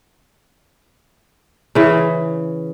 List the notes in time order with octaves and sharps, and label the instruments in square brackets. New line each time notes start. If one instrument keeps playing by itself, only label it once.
[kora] C#3 E3